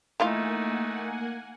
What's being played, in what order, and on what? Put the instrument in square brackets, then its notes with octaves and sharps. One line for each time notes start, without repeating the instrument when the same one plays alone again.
[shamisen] D#3 E3 F4 [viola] A3 D#4 [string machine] A#3 F#5 G#5